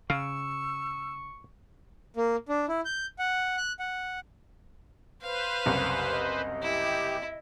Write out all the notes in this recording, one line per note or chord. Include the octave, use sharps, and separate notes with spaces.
C#3 F5 C#6 E6
A#3
D4
E4
G6
F#5
F#6
F#5
B4 C5 F5
F#1 C2
D#5
E4 G4